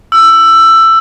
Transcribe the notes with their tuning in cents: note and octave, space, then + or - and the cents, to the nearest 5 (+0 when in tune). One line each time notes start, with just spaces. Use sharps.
E6 +15